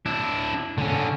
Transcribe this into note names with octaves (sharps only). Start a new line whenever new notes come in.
D4 E4
D3 C#4